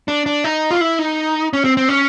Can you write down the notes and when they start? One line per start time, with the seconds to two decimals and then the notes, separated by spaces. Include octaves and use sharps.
0.08 D4
0.26 D4
0.44 D#4
0.71 F4
0.81 E4
0.99 D#4
1.53 C#4
1.65 C4
1.77 C4
1.89 C#4